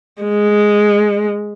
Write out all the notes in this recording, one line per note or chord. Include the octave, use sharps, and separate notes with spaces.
G#3